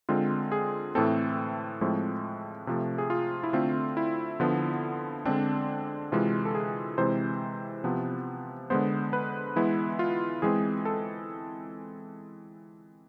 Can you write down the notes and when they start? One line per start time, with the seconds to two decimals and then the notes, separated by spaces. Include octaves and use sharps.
0.09 D3 G#3 C4 F4
0.52 G#4
0.95 A2 E3 A3 C4 A4
1.81 A2 F3 G#3 C4
2.67 C3 F3 A3
2.98 G#4
3.10 F4
3.43 E4
3.53 D3 A3 C4 F4
3.97 E4
4.40 D3 F3 B3
5.25 D3 G#3 C4 D4
6.12 C3 E3 G#3 F4
6.45 A4
6.55 G#4
6.98 C3 E3 G#3 C4 C5
7.84 C3 F3 B3
8.70 D3 G#3 B3 C5
9.13 B4
9.56 E3 G#3 B3 E4
9.99 F4
10.42 E3 G#3 C4 G#4
10.85 A4